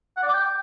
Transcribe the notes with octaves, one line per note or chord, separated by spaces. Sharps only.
F#5
D5
D6
G5